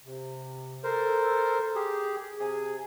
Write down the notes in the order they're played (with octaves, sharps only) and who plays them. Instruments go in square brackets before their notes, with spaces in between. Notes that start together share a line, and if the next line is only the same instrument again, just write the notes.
[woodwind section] C3
[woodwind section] A4 [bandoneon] A#4 C5
[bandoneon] G4 G#4
[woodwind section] C3 G#5 [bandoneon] G#4